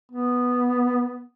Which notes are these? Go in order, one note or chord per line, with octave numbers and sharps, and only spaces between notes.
B3